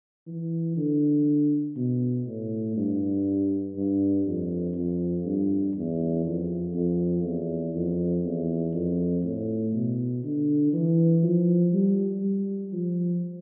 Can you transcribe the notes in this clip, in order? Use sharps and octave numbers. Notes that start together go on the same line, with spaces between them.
E3
D3
B2
A2
G2
G2
F2
F2
G2
E2
F2
F2
E2
F2
E2
F2
A2
B2
D3
E3
F3
G3
G3
F3